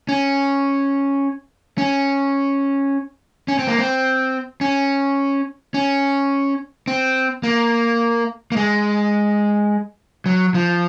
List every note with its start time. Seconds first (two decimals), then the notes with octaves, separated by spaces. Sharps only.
0.09 C#4
1.78 C#4
3.48 C#4
3.59 C4
3.68 A#3
3.79 C4
4.61 C#4
5.74 C#4
6.87 C4
7.43 A#3
8.52 A#3
8.57 G#3
10.26 F#3
10.54 F3